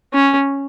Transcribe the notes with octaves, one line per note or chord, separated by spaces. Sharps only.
C#4